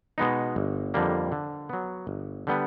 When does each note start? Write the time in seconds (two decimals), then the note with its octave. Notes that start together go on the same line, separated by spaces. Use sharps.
0.18 B2 G#3 B3 D#4
0.56 G1
0.94 F2 D3 G3 A#3
1.32 D3
1.69 F#3 B3
2.07 G1
2.47 D3 G3 B3